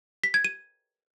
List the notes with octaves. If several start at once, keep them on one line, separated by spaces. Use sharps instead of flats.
B6
G#6
D#7